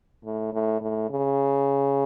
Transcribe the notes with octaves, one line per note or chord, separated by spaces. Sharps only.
A2
A2
A2
C#3